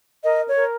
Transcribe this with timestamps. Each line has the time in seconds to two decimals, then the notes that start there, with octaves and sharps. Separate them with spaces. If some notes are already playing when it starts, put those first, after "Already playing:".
0.24 A#4 D#5
0.47 C#5
0.55 A#4